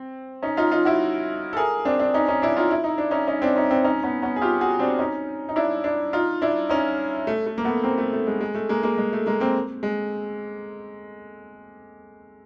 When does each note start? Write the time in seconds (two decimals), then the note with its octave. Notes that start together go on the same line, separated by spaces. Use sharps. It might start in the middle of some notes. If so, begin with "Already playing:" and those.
Already playing: C4
0.43 C#4 D#4
0.57 D#4 F4
0.72 D#4 F4
0.85 E4 F#4
1.53 A4
1.57 G#4 A#4
1.85 C4 D4
1.99 C4 D4
2.14 C#4 D#4
2.28 C#4 D#4
2.42 D4 E4
2.57 D#4 F4
2.71 E4
2.84 D#4
2.98 D4
3.11 C#4 D#4
3.27 C#4 D#4
3.42 C4 D4
3.56 C#4 D#4
3.71 C4 D4
3.84 C#4 D#4
4.04 B3 C#4
4.22 B3 C#4
4.36 G#4
4.42 F4 G4
4.61 F#4 G#4
4.79 C4 D4
4.99 C#4 D#4
5.49 D#4
5.56 D4 E4
5.84 D4 E4
6.13 D#4 F4
6.42 D4 E4
6.69 C#4 D#4
7.27 A3
7.46 A3
7.58 A#3
7.64 A3 B3
7.84 A#3 C4
7.98 A3
8.13 A3
8.27 G#3
8.41 G#3
8.55 A3
8.69 G#3 A#3
8.83 G#3 A#3
8.98 G#3
9.13 A3
9.26 G#3 A#3
9.40 A#3 C4
9.83 G#3